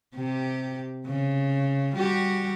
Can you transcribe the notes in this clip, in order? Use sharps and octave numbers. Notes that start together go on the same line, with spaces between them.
C3 G4
C#3
G3 F#4 G4